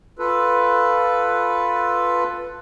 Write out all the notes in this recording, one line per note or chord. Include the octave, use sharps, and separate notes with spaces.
F4 A4 B4